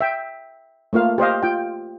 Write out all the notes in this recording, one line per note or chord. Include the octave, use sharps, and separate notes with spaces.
E5 G5
A3 A#3 F4 F5
G4 C5 D#5 F5
F4 G5